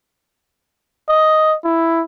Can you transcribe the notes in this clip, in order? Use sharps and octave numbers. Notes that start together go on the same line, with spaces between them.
D#5
E4